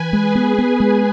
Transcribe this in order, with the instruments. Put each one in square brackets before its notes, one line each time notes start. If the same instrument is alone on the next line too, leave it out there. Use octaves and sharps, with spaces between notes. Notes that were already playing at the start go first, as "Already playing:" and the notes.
Already playing: [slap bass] E3 [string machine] B4 G#5
[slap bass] G#3 [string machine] G#4
[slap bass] B3
B3
G#3